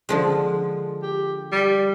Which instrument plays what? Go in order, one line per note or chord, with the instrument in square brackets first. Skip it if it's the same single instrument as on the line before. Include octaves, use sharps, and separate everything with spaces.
[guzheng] D3 F3 G#3
[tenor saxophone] G4
G3